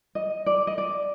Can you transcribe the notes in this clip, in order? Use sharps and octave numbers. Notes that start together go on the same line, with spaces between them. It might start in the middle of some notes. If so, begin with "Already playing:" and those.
D#5
D5
D#5
D5